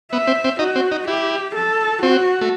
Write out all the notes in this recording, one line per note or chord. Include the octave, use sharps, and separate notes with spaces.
B3 E5
C4
C4
D#4 F#4
C4
D#4
E4 G4
A4
C4 F#4
A3